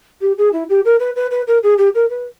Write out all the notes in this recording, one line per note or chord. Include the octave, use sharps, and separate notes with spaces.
G4
G#4
E4
G4
A#4
B4
B4
B4
A#4
G#4
G4
A#4
B4